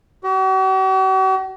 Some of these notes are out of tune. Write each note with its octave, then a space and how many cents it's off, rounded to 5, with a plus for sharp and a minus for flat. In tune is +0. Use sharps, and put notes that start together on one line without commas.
F#4 +45